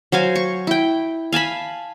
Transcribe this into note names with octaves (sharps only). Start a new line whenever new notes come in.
F#3 C5 F5 G#5
C#6
E4 G5
F5 G#5 A5 B5